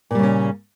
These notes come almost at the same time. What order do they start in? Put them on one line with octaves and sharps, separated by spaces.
A#2 G3 C#3 C#4